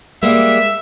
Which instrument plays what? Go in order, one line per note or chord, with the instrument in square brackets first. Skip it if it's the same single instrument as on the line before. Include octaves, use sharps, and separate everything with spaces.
[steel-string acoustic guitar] G3 G#3 A#3 [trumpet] E5